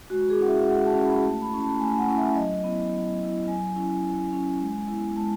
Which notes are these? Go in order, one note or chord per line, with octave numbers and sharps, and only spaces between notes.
G#3 F#4
G#4
C#4 E4 F#5
E5
G#3 F#5
A5
C#4 E4
B5
A3 A5
B5
C#4 E4
A5
A3 G#5
G#5
F#5
C#4 E4
E5
F#3 D#5
B3 E4
F#3
B3 E4
F#3 G#5
C#4 E4
F#3
C#4 E4
G#3
B3 E4
G#3 A5